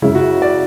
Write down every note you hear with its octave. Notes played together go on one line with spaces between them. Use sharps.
F#2 C#3 G#3 E4
F#4
D5